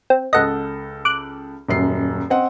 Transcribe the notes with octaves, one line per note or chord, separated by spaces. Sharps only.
C4
C#2 A4 D#5 F#5 A#6
D6 F#6
D#1 F#2 C7
C4 D#5 F#5